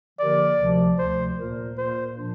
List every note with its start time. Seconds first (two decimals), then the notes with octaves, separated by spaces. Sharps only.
0.19 D3 F3 A#3 G4 A#4 D5
0.59 D2 C3 F3
0.99 D2 C3 F3 C5
1.38 A#2 A#3 F4 A#4
1.77 A#2 A#3 F4 A#4 C5
2.16 A#2 F3 D4